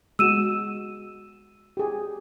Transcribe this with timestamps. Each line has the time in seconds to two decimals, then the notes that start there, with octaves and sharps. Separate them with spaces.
0.19 G#3 B3 F#4 E6 D#7 E7
1.77 G4 G#4